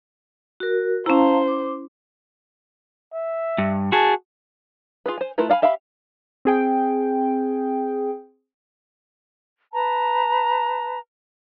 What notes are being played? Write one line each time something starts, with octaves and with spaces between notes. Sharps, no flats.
F#4 A#4
C#4 E4 C5 F5 A5 A#5
D6
E5
G2
F#4 G#4 A5
F4 G#4 B4
C5 G#5
A3 E4 F4 A#4 B4
D4 F5 G#5 B5
G4 E5 F5 G5 B5
C4 G#4 G5
B4 A5 A#5